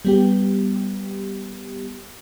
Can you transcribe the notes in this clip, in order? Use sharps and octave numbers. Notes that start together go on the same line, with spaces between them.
G3 B3 G4